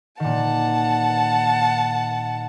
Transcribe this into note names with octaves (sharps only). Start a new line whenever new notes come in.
A#2 D#3 F#5 A5